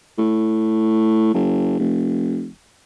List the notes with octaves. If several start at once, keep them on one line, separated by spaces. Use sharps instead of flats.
A2
F#1
F1